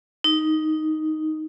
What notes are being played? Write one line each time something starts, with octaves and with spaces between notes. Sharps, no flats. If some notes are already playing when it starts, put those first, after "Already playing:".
D#4